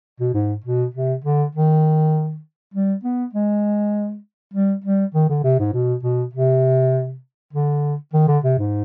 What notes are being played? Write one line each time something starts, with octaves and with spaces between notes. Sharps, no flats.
B2
G#2
B2
C3
D3
D#3
G3
B3
G#3
G3
G3
D#3
D3
C3
G#2
B2
B2
C3
D3
D#3
D3
C3
G#2